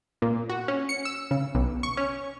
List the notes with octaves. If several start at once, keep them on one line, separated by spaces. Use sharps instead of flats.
A#2
F#4
C#4
C#7
E6
C#3
B1
C#6
C#4